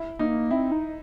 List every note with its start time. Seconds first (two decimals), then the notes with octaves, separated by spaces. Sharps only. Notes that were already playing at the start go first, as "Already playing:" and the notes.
Already playing: E4
0.19 A#3 D#4
0.51 C4 E4
0.72 D#4